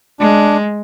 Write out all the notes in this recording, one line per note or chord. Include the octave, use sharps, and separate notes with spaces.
G#3 D4